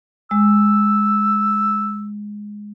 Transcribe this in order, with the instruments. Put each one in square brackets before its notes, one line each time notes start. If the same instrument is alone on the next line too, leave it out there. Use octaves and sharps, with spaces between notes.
[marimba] G#3 [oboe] E6